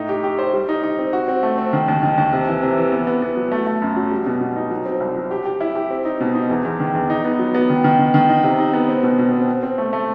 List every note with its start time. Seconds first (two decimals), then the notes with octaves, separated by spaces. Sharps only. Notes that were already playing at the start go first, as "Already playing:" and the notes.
Already playing: A2 D#4
0.09 G4
0.24 G4
0.39 C5
0.53 G3
0.69 D#4
0.83 D#4
0.99 C4
1.13 F#4
1.28 C4
1.43 A3
1.58 C4
1.73 D#3
1.88 D#2
2.03 D#3
2.18 D#2
2.32 C3
2.48 E3
2.62 C3
2.77 E3
2.92 B3
3.07 B3
3.22 B3
3.37 F#3
3.52 A3
3.67 A3
3.82 F#2
3.96 F#3
4.11 G3
4.26 B2
4.41 B2
4.56 D#4
4.71 F#3
4.86 C4
5.00 C2
5.16 F#3
5.31 G4
5.45 G4
5.61 E4
5.75 G4
5.90 C4
6.05 D#4
6.20 B2
6.35 D#4
6.50 E2
6.65 E2
6.80 D#3
6.95 E2
7.10 D#4
7.25 B3
7.39 F#3
7.55 B3
7.70 D#3
7.84 D#3
7.99 D#3
8.14 D#3
8.29 D#4
8.44 C3
8.58 D#4
8.73 B3
8.89 C4
9.03 B2
9.18 B2
9.33 C4
9.48 C4
9.63 C4
9.78 A3
9.93 A3